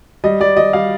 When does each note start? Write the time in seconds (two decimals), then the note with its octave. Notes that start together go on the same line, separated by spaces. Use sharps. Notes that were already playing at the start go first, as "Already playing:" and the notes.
0.24 G3 D#5
0.40 G3 D5
0.57 G3 D#5
0.73 G3 F5